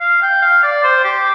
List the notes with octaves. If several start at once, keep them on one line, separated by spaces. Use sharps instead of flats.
F5
G5
F5
D5
C5
G4